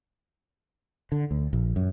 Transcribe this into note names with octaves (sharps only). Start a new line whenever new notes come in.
D3
D2
A#1
F#2